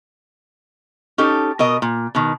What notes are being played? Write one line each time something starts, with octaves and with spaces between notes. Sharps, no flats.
C#4 D#4 G4 A4
B2 A#4 D#5
A#2
B2 D#3